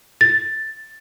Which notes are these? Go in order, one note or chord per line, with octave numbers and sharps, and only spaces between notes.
A6